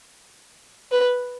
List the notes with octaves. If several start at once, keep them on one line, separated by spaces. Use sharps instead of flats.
B4